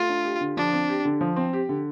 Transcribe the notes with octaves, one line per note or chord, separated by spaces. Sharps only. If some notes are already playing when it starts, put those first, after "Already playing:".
Already playing: A3 F4
D4
G4
D3
F3 D4
C4
G4
D3
F3
C4
G4
D3